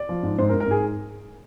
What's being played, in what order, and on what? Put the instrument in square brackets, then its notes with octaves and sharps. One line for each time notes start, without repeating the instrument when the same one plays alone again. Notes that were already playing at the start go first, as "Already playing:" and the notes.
Already playing: [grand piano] D5
F3
G#2
G#2 C5
A#4
G#2
A#4
G#2 G#4